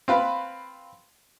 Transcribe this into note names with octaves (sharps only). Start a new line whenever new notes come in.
C4 F4 B4